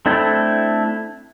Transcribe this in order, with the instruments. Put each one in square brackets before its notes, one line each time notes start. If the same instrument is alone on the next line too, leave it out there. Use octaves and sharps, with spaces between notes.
[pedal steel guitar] A3 C4 D4 E4 A4